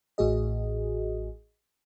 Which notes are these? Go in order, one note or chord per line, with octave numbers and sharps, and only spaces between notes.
A1 A2 F#4 G#4 D#5